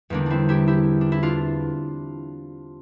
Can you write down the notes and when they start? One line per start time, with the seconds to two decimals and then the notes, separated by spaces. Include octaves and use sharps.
0.10 E2 D3 G3 A#3 D4
0.26 C4 D4 E4
0.49 E4 G4
0.67 E4 G4
1.01 D4
1.12 E4
1.23 D4 F4